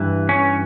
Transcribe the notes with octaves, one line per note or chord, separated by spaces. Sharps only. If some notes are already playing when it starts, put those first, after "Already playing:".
Already playing: G2 E3
C#4